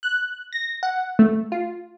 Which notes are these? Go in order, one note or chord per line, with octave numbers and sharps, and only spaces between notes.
F#6
A#6
F#5
A3
F4